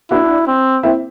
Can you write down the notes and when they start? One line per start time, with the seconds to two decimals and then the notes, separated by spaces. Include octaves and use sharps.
0.11 D4 E4 F#4
0.47 C4
0.83 C4 E4